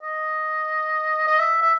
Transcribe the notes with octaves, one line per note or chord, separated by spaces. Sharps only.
D#5
D#5
E5
E5